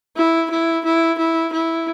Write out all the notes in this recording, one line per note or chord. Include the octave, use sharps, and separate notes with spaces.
E4
E4
E4
E4
E4